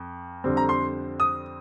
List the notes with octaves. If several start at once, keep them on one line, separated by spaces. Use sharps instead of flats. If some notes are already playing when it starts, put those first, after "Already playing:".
Already playing: F2
F2 D3 G3 C4
A#5
C6
D#6